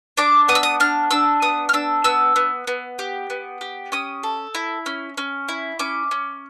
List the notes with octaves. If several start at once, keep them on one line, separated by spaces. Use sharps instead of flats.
D4 D6
B3 D#6
E6
D#6
D4 F6
D4 E6
B3 D#6
F6
D4 E6
B3 E6
B3
B3
G4
B3
G4
C#4 D#6
A4
E4
C#4
C#4
E4
C#4 D6
C#4